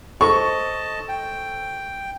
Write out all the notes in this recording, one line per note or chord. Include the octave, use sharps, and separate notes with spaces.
A4 C5 D#5 A5 C#6
G5